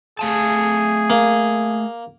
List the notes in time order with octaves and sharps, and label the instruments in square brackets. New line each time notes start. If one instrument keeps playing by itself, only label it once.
[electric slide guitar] A3 F5 A5 [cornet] G#4
[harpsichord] A#3